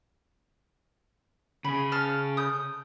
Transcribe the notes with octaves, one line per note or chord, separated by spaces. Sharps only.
C#3 G#4 B5
A5 F6
D#6 G6